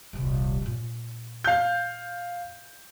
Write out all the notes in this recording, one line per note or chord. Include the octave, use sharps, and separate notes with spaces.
D#1 C2
A#2 C#4
F5 G6